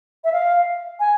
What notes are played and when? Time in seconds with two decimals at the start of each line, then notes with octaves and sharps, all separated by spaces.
0.24 E5
0.32 F5
1.00 G#5